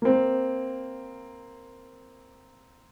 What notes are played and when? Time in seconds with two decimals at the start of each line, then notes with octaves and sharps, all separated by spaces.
0.02 A#3 C4